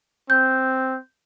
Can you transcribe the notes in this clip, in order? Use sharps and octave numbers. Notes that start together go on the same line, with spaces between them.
C4 G6